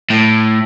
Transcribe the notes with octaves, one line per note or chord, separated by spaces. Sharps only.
A2